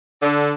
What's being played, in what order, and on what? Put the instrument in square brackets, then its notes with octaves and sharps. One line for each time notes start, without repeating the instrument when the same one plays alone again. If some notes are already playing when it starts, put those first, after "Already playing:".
[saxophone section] D3